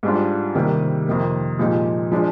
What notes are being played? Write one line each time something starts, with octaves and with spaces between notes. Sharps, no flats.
G#2 G3 D4 F4
C3 D#3 G3 A#3
F2 C3 D#3 A#3
A#2 F3 G#3 D#4 G4
F3 G#3 D4